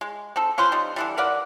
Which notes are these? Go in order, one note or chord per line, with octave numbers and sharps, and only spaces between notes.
G#3
C4 D#4 A4
C#4 F4 B4 C5
G3 C4 D#4
D3 E3 G3
A#4 B4 D5 F#5